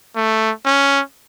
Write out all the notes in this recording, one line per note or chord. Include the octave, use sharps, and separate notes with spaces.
A3
C#4